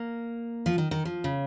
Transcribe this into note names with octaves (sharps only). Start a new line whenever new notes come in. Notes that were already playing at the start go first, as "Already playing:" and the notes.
Already playing: A#3
F3
D#3
D#3
F3
C#3